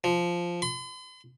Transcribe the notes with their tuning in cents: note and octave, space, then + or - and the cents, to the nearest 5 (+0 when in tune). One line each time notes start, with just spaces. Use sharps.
F3 -5
C6 -45